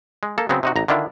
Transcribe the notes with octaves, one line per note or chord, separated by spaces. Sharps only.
G#3
A#3 A4
C#3 F#3 B3 C4
C3 D#4 F#4
A1 A#5
D3 D#3 D4 E4 F4